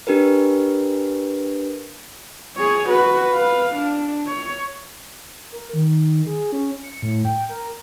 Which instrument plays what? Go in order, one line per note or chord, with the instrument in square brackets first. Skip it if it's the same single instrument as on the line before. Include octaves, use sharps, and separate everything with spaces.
[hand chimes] D4 G4 A#4 B4
[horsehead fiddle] G#4 C#5
F#4 B4
B4 F5
D4
C#5
[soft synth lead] A#4
D#3
G#4
C#4
C#7
A2
G5
A#4